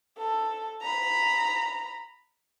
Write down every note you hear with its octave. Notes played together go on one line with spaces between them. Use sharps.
A4
A#5 B5